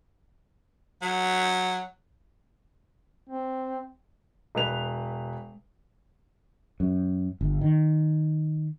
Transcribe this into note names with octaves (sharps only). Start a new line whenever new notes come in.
F#3
C4
E1 B4 F7
F#2
G1
D#3